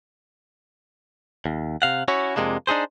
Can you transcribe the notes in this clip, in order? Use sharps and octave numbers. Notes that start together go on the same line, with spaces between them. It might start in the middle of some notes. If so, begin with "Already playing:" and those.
D#2
C3 F5 F#5
C#4 E4 F#4 C#5
F2 G#2 C3 G#3 A#3 D4
D4 D#4 G#4 C5